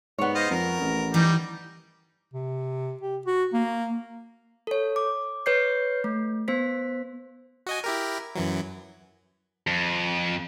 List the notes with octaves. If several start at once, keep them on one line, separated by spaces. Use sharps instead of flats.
G#2 B3 C#5
C5 D#5 F5
F2 A#4
A1
E3 G3 D#4
C3
G4
F#4
A#3
A4 C#5
D6
B4 C#5 G6 C7
A3
B3 C5 B6
F#4 D#5 G#5
E4 G4 A#4
F#2 E3 F#3
F2